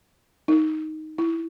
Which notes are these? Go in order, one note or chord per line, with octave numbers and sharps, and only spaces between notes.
D#4
E4